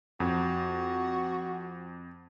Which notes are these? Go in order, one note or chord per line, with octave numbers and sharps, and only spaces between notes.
F2 F#4